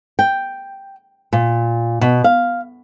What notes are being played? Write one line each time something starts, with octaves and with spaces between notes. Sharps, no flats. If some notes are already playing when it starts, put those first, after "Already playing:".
G5
A#2
B2
F5